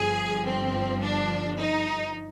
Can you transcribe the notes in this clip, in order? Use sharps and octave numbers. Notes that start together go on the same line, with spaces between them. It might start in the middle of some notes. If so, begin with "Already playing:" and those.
Already playing: G1 G2 F3 G#4
C4
D4
D#4